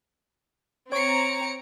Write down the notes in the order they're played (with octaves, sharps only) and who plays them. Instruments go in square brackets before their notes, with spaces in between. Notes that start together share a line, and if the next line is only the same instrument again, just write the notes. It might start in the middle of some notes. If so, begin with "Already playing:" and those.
[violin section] C4 A#5 [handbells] C#5 C#6 [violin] C#7 D7